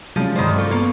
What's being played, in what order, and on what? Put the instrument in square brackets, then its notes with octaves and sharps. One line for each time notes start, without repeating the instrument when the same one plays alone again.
[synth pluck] C3 C#4 [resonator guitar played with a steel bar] F3 [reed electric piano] F#3 G#3
[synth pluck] G2 C4 D5 [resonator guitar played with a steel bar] D#3 C5
[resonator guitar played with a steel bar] F4 [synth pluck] A4 C#6
[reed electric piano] G2 B3 [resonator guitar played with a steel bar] A#3